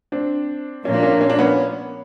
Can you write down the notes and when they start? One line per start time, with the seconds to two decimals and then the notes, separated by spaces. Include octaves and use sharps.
0.12 C4 D4
0.85 A#2 F3 A#3 C#4
0.94 D4
1.03 C#4
1.12 D4
1.21 C#4
1.30 D4
1.39 B3 C#4